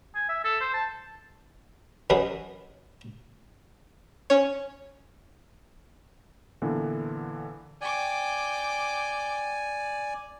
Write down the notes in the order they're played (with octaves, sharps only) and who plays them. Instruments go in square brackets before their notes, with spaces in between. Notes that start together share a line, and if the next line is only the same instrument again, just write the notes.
[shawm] G#5
E5
A4
C5
A5
[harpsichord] F#2 B2 B3 G#4
[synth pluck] C#4 C#5
[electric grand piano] A#2 D3 E3 B3
[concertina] D5 G#5 [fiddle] G5 D6